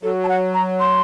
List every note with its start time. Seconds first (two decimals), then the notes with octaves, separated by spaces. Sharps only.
0.03 F#3 A4
0.24 A5
0.29 F#5
0.54 A#5
0.80 C6